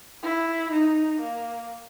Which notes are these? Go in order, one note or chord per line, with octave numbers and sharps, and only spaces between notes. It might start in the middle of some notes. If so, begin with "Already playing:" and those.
E4
D#4
A#3